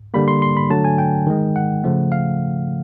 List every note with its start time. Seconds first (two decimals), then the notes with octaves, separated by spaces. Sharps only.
0.14 D3 G3 A#3 B5
0.28 C6
0.42 C6
0.57 B5
0.70 D3 F#3 A3 A5
0.84 G#5
0.98 G5
1.27 D#3 G#3
1.56 F#5
1.84 C#3 F3 A3
2.12 F5